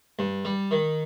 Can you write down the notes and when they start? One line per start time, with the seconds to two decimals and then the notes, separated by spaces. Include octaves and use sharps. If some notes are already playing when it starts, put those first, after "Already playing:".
0.19 G2
0.45 G3
0.71 D#3